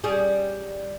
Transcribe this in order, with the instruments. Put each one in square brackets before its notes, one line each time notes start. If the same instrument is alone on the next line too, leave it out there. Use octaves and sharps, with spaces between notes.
[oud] G3 C#4 G#4